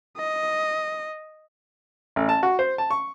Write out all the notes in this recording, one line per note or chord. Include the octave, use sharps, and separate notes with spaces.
D#5
A1
A5
F#4
C5
A5
C#6